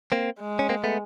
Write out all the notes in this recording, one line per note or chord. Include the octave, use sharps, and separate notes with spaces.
A#3 C4
G#3
C#4
A#3 C4
A3 B3